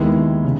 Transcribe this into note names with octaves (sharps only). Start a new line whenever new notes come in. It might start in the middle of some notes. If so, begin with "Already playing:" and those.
Already playing: D#2 D#3 G#3 B3 E4
C#3